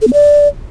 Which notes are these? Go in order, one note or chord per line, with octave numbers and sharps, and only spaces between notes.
A4
B3
D5